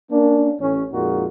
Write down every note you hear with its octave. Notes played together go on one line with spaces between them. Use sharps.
A#3 C#4 D4
A1 C#4
F2 A#2 G#3 D#4 F4 F#4